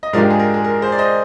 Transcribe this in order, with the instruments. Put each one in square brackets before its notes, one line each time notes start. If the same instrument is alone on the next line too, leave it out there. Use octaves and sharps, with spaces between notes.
[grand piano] D#5
[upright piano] G#2 F3 G#3 D4 G4 [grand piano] A#4 D5
[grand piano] G#4
A#4
G#4
A#4
G#4 C5
D5
C5 D#5